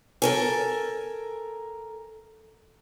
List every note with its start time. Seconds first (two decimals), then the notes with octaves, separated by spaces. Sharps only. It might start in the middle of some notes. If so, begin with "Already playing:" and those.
0.22 A4 A#4 G#5